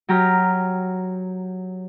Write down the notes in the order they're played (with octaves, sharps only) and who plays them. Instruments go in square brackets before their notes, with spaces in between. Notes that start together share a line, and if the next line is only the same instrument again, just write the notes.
[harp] F#3 G4 A#5 F6